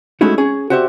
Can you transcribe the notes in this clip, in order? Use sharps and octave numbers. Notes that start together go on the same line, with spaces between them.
G#3 A3 C#4 D#4 E4 F#4
C#4 G#4
F#4 G4 C5 D5 E5